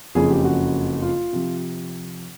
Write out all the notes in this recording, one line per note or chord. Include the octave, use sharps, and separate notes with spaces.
F#1 F2 C#3 F3 G#4
G4
F#4
F4
C3 F3